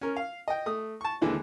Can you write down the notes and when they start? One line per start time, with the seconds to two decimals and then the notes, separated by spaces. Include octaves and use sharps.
0.01 C#4 A#4
0.16 F5
0.48 D#5 G5
0.66 A3 D#6
1.01 A5 C#6
1.21 D#2 D3 E3 G#3